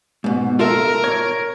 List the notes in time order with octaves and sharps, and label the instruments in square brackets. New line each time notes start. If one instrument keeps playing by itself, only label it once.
[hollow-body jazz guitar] G#2 B2
[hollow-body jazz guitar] F4 A4 E5 [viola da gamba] A#4
[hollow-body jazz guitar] C#5